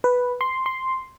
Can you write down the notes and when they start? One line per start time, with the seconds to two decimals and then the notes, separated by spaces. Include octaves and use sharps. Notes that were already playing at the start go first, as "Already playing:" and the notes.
0.04 B4
0.41 C6
0.66 C6